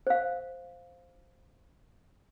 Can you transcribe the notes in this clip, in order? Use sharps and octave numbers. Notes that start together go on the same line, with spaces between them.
C5 F5